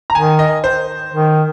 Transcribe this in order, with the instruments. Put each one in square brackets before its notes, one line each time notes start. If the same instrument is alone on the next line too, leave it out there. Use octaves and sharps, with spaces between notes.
[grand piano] A#5
[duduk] D#3 [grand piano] G#5
[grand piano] D#5
C5
[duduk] D#3